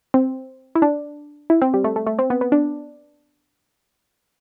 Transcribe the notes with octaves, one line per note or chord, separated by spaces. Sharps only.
C4
E4
D4
E4
C4
G3
A3
A3
A3
C4
B3
B3
D4